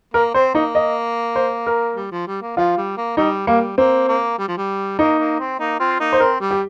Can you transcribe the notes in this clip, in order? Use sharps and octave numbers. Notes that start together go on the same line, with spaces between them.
A#3 A#4
C4 C5
A#3 D#4
D#5
C5
A#4
G3
F3
G3
A#3
F3 F4
G3
A#3
G3 D#4
G3 A#3
A#3 C4
A#3
G3
F3
G3
A#3 D#4
A#3
C4
A#3 D#4
C4 F4
A#3 D#4
C5
C4 A#4
G3
G4